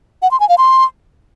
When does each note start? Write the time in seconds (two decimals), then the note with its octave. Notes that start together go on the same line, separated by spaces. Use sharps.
0.22 F#5
0.31 C6
0.40 G#5
0.49 F5
0.58 C6